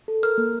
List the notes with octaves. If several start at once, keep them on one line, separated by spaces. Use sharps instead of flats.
A4
A#4 F6
A#3